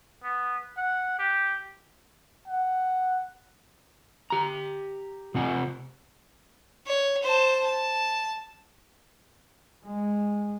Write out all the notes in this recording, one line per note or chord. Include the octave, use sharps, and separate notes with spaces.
B3
F#5
G4
F#5
G4 A#5
C3 C4 F4 F#5 G#5
C#5
C5 A5
A5
G#3